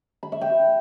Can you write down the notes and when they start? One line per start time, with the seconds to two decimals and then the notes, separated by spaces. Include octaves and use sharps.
0.23 B5
0.32 E5
0.41 G5